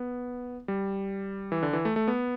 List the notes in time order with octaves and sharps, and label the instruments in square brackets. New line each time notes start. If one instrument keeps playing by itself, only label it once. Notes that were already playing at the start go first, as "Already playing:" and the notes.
Already playing: [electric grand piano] B3
G3
E3
D3
E3
A3
A3
B3